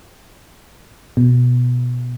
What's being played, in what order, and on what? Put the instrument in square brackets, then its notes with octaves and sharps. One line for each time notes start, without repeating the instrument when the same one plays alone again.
[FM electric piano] B2